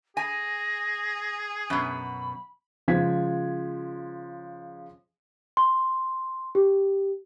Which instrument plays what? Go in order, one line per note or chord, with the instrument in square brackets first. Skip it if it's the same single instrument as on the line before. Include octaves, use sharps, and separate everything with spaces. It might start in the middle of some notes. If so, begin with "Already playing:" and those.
[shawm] G#4 [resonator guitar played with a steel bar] G#5 [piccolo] A#6
[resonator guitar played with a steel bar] F#2 B2 [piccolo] B5
[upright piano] C#3 F3 G#3 G#6 B6
[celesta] C6
G4